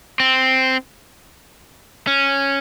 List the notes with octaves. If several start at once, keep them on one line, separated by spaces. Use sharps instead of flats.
C4
C#4